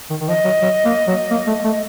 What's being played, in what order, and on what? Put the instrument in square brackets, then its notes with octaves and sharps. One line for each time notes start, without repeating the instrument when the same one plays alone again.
[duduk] D#3
D#3
[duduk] F3 [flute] D#5
[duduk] F#3
F#3
A#3
F#3
A#3
A3
A3